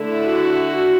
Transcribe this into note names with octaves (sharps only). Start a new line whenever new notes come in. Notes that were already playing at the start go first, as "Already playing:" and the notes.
Already playing: D3 A3 E4
F#4